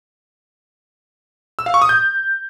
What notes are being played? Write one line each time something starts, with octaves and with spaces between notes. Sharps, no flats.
E6
F5
C#6
D#6
G6